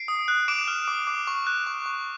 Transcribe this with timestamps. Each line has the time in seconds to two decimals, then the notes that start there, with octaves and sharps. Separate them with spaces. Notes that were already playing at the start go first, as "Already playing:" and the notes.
Already playing: C7 D7
0.08 D#6
0.28 F#6
0.48 D6 D7 E7
0.68 F6
0.88 D6
1.07 D6
1.27 C#6
1.47 F#6
1.67 C#6
1.86 C#6